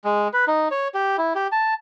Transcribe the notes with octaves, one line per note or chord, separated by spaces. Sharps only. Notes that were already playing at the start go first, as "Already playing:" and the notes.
G#3
B4
D#4
C#5
G4
E4
G4
A5